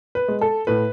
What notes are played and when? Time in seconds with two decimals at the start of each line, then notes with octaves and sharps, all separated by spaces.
0.15 B4
0.28 G#3
0.41 A4
0.67 A2 B4